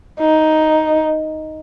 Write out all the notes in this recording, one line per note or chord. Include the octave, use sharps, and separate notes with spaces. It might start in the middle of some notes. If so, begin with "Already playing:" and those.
D#4